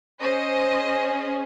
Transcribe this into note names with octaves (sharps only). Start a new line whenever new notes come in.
C#4 G#4 C5 D#5